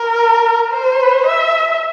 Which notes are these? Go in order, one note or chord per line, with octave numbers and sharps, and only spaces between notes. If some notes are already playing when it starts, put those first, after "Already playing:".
Already playing: A#4
C5
E5